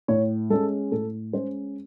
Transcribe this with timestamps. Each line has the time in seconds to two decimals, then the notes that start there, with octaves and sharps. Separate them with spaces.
0.08 A2 C#5
0.50 G#3 C#4 A4
0.92 A2 A4
1.33 G#3 C#4 C5